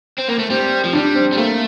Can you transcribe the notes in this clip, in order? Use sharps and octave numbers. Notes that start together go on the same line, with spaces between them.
C4
A#3
A3
G3 C4
F3
G3 D4
C4
G3
A3 A#3